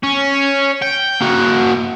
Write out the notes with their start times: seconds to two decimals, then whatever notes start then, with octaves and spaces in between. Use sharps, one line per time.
0.03 C#4
0.82 G5
1.20 A#3 F#4